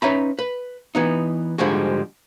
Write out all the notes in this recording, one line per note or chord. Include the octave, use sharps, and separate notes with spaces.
C#4 D#4 B4 E5 A#5 B5
B4
E3 B3 D#4
G#2 D3 F3 G3 G#3 F#4